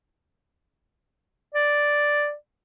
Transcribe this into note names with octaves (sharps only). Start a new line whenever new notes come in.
D5